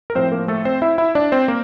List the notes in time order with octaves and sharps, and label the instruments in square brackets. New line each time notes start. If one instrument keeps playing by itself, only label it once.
[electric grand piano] A#4
A2 F3 C4 C5
A#3 A#4
A3 A4
C4 C5
E4 E5
E4 E5
D4 D5
C4 C5
A#3 A#4